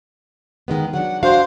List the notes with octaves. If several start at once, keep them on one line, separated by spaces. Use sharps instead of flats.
D#3 G#3 B3
F#3 D4 F#5
D4 F#4 C5 F5